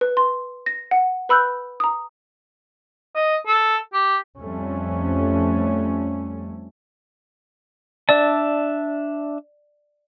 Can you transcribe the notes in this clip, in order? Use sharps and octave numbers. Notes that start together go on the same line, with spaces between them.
B4
C6
A#6
F#5
B4 B5 E6 F#6 G6
A#5 D#6
D#5
A4
G4
F2 G3 A3 C#4
D4 D5 E5 A5